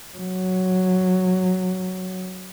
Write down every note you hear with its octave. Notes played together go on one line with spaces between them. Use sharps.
F#3